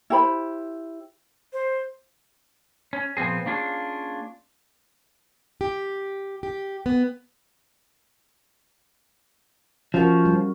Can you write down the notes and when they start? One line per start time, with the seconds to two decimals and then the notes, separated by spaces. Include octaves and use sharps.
0.10 E4 G4 C5 B5
1.53 C5
2.93 C#4
3.17 A#2 F3 B3 C4 G#4
3.46 A#3 C#4 D4 F4 G#4
5.61 G4
6.43 G4
6.86 B3
9.94 F3 C#4 F#4 A#4
10.25 G3